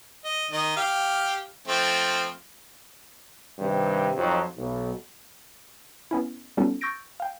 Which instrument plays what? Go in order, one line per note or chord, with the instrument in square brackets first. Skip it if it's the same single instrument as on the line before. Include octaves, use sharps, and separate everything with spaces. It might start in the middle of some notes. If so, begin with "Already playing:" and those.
[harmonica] D#5
D#3 D#5
G4 F5
F3 A3 C4
[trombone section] G2 C3 D#3
F2 F3 F#3 C4 D#4
B1
[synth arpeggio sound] B3 C#4 E4
G3 B3 C#4 D#4 F4 A4
C#6 E6 G6 A6 A#6 D7
F5 G5